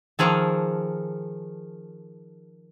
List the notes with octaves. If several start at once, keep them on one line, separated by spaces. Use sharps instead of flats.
D#3 F3 G#4 A4